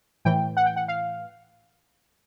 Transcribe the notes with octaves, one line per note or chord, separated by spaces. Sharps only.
A2 E3 G5
F#5
G5
F#5
F5